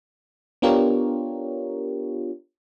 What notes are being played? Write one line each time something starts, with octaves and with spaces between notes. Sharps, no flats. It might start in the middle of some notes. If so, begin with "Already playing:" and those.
B3 D4 F4 G4 A#4 C#5